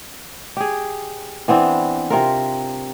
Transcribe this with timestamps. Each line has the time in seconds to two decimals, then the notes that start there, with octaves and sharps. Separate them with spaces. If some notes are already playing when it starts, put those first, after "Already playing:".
0.57 G4 G#4
1.48 E3 B3 C4 D4
2.10 C3 F4 A#4